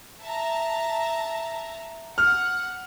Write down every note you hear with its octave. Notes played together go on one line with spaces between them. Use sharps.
E5 A5 A#5
F#5 F6